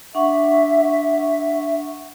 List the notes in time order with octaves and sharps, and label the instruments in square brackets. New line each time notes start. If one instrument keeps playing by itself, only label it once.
[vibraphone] D4 F#5 C#6 [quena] E5